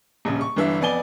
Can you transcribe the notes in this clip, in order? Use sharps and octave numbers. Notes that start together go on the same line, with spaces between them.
D#1 A#1 C#3
C#6
G1 G2 D3 E3 E5
F2 B3 D5 G#5 G7